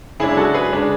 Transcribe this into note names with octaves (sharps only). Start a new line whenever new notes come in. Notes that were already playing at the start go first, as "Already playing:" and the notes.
F#2 C#3 G#3 D4 E4 G#4
F#4 A4
G#4 B4
C#3 G#3 D4